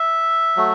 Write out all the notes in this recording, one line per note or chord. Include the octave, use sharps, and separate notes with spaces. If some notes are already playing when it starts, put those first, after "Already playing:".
Already playing: E5
F#3 A3